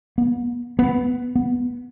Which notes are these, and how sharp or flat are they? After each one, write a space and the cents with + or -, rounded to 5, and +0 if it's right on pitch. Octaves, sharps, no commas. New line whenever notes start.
B3 -35
B3 +0
B3 -10